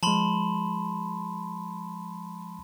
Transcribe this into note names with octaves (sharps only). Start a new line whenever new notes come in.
F3 G#3 A5 B5 C6